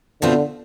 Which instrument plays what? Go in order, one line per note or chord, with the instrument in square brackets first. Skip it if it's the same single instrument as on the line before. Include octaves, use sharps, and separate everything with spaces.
[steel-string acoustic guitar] B2 A3 C4 F4 [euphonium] D3